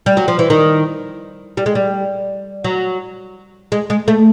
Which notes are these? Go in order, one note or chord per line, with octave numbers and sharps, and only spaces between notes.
G3
F#3
F3
E3
D#3
G3
G#3
G3
F#3
G#3
G#3
A3